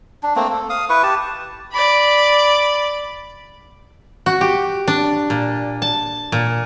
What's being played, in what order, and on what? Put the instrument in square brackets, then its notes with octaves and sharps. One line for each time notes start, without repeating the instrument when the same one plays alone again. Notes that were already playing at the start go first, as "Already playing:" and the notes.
[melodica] D4
A3 A#3 C4
A4
F5 D#6
E4 B4 C#6
G4 A5
[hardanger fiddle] D5 B5
[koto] F#4
G4
D4
A#2
A5
A#2